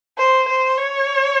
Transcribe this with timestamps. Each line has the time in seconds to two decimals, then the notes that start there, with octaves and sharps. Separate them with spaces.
0.18 C5
0.48 C5
0.77 C#5